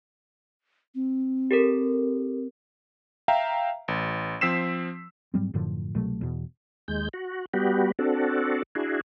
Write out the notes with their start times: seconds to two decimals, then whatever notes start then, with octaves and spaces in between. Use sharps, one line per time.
0.95 C4
1.51 G4 A4 A#4
3.28 E5 F5 G5 A#5
3.88 A1
4.41 F3 C4 E6 B6 C7 E7
5.34 G#2 F#3 G3 C4
5.54 F#2 A2 D3 F3
5.95 C2 B2 F#3 A3
6.21 E2 B2
6.88 D#2 G#3 G6
7.13 F#4
7.54 G3 B3 F#4 G4
7.99 C4 D4 F#4 A4
8.75 D4 E4 F#4 G#4